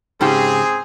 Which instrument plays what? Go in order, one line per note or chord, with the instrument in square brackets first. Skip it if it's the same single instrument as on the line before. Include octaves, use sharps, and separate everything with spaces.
[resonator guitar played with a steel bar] G#2 C#3 G4 [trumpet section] C4 G#4